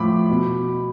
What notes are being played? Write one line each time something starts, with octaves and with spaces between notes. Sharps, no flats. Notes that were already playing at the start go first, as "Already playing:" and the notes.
Already playing: A2 F3 B5 D6
B2